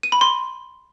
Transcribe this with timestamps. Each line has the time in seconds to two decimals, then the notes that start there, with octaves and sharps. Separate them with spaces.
0.03 D#7
0.12 B5
0.21 C6